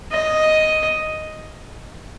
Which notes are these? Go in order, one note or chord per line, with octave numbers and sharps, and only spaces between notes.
D#5